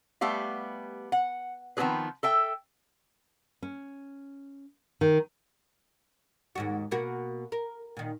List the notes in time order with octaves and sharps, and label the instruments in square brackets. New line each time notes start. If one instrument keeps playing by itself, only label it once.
[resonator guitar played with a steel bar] G3 A3 B3 G4 F5
F#5
D#3 F3 B3 C4 G#4 B4
A4 E5 G5
[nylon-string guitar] C#4
D#3
[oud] D#2 G#2 F#4
B2 A#3 F#4
A#4
A#2 D#3